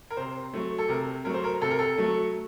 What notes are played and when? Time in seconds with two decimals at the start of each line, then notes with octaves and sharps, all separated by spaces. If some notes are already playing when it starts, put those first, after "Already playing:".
0.10 A#4
0.17 C3 C5
0.54 F#3 A3
0.78 A4
0.89 C3 A#4
1.25 F#3 A3 A#4
1.34 C5
1.44 A#4
1.61 C3 A4
1.71 A#4
1.79 A4
1.98 F#3 A3